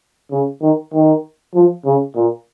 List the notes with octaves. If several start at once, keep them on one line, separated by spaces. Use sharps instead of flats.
C#3
D#3
D#3
F3
C#3
A#2